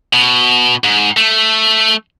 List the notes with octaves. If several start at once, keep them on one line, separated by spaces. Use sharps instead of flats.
B2
G#2
A3